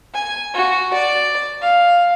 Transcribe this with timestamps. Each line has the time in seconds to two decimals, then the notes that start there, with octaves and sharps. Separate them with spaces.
0.14 G#5
0.54 F#4
0.94 D5
1.62 F5